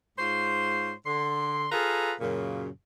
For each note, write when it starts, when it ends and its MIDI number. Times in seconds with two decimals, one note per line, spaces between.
0.19 0.93 44
0.19 0.93 65
0.19 0.93 72
0.19 0.93 73
0.19 0.93 84
1.06 1.67 50
1.06 1.67 84
1.72 2.14 65
1.72 2.14 68
1.72 2.14 69
1.72 2.14 71
1.72 2.14 77
1.72 2.14 82
2.20 2.68 42
2.20 2.68 46
2.20 2.68 49